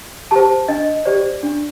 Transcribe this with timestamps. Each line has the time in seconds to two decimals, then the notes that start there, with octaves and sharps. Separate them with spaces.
0.31 G4 C5 A5
0.68 D4 D#5
1.05 G4 C5 D5
1.43 D4